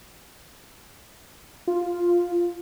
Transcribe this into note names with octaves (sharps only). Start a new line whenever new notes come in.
F4